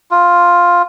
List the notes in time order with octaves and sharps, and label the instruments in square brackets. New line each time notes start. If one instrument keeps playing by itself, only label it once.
[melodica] F4